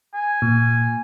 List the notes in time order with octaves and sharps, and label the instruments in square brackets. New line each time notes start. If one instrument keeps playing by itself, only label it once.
[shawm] G#5
[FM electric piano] A#2